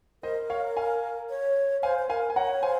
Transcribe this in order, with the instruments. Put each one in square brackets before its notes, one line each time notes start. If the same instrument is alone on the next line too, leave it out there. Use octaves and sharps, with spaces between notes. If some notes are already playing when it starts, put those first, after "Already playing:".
[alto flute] A#4 [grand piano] C5 D#5
[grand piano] C#5 F5
F5 G#5
[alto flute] C#5
[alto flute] C5 [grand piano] F5 G#5
[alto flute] C5
[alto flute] A#4 [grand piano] F5 G#5
[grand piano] G#5
[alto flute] C#5 [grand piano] F#5 A#5
[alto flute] C5 [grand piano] F5 G#5